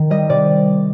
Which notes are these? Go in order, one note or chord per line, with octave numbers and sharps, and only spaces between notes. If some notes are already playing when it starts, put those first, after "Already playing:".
Already playing: D#3
G3 D#5
C3 D5